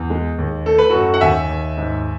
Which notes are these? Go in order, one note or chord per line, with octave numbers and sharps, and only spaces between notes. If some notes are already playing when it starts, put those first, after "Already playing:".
Already playing: E2
G#3
D#2
A3 A4
B4
F#2 F#4 A4
F#5
D#2 E5 G#5
D#2
G#2